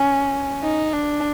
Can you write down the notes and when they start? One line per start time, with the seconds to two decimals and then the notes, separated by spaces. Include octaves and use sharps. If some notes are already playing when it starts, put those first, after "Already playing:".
Already playing: C#4
0.62 D#4
0.93 D4